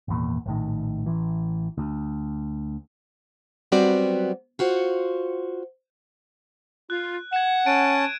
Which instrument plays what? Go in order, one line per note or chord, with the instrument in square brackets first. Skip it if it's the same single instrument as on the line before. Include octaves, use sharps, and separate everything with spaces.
[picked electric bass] G#1 E2 A#2
A#1 A2 D#3
A1 E3
D2
[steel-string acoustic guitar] F#3 G3 B3 C4 F#4 D5
F4 F#4 C5 F#5
[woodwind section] F4 [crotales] F#6
[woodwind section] F#5 [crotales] G#6 E7
[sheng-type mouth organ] C#4 A5 [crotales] D7 D#7